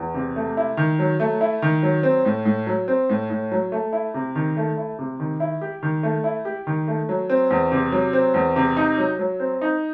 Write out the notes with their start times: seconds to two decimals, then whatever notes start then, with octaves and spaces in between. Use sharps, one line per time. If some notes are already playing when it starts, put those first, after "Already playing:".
Already playing: E2
0.14 C3
0.36 A3
0.57 E4
0.77 D#3
0.99 F#3
1.20 A3
1.41 E4
1.62 D#3
1.83 F#3
2.03 C4
2.25 A2
2.45 A2
2.67 F#3
2.88 C4
3.10 A2
3.30 A2
3.52 F#3
3.72 A3
3.93 E4
4.14 C3
4.35 D#3
4.57 A3
4.77 E4
4.99 C3
5.20 D#3
5.40 E4
5.61 G4
5.83 D#3
6.03 A3
6.24 E4
6.45 G4
6.67 D#3
6.88 A3
7.09 F#3
7.30 C4
7.50 E2
7.72 C3
7.92 F#3
8.13 C4
8.34 E2
8.56 C3
8.77 D#4
8.98 F#3
9.19 F#3
9.40 C4
9.61 D#4